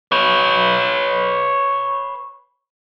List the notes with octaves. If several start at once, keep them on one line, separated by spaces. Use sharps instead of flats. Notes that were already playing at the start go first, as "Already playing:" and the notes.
B4 C#5